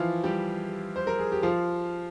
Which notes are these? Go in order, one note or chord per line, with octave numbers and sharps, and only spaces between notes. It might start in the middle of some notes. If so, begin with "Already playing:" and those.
Already playing: E3 F3 E4 F4
G3 G4
C5
A#4
G#4
G4
F3 F4